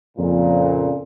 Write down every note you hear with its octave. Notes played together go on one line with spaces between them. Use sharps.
F2 A#2 C#3